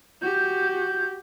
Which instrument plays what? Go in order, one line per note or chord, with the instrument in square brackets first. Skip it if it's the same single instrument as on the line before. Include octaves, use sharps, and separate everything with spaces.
[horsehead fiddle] F#4 G4 [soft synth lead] G6